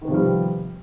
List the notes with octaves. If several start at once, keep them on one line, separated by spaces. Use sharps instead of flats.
C3 D#3 F3 G3 B3